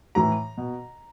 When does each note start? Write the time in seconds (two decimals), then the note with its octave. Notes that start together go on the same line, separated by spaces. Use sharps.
0.15 A2 E3 A#5
0.57 B2